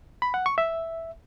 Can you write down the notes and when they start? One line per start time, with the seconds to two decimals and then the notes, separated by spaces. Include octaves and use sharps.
0.22 B5
0.34 F#5
0.46 C#6
0.58 E5